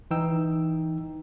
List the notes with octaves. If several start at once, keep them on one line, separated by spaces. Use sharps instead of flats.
E3 D#4 G5 E6